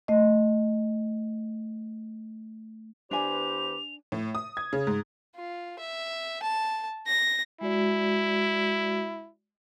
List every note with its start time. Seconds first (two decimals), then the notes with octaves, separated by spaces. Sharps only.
0.08 A3 D#5
3.11 E2 D4 G4 B4 C5 G#5 F7
4.12 A2
4.35 D#6
4.57 G#6
4.73 C#3
4.87 G#2
5.35 F4
5.78 E5
6.42 A5
7.06 A#6
7.61 G#3 E4 F#4 D5